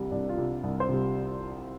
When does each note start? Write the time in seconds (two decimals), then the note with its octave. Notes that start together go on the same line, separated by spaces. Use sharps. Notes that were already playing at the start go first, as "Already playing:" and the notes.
Already playing: C2 C3 G3
0.11 C2 D4
0.29 F4
0.37 C3 G3
0.63 C2
0.80 C5
0.89 C3 G3